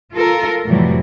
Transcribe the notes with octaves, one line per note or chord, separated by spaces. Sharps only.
F4 A4 A#4
F2 A2 C3 E3 F#3 G3